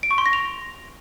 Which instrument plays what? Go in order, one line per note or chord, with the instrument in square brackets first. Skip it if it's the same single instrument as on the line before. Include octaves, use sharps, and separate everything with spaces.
[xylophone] D7
C#6
C6
A#6
F7